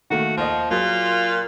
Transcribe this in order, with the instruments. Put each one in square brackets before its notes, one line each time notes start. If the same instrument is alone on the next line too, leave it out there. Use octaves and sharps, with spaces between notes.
[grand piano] D#3 A3 A#3 [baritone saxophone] F#4
[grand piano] D#2 D#5 [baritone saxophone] F3
[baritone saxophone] A#2 [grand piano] F#3 G#4 [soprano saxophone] F4